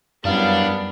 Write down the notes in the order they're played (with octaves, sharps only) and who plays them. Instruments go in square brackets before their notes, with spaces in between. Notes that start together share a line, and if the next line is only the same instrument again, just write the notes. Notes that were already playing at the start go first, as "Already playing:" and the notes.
[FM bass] F#2 [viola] G3 B3 [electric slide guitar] D4 [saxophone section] E4 A#4 F5